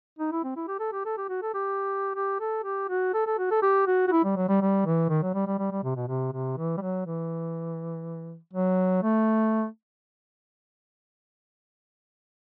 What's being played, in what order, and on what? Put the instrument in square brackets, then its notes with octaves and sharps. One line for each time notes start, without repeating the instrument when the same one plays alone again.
[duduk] D#4
E4
C4
E4
G4
A4
G4
A4
G4
F#4
A4
G4
G4
A4
G4
F#4
A4
A4
F#4
A4
G4
F#4
F#4
E4
G3
F#3
G3
G3
E3
D#3
F#3
G3
G3
G3
G3
C3
B2
C3
C3
E3
G3
F#3
E3
F#3
A3